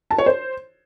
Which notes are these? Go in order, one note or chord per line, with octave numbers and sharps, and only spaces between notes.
A5
C#5
C5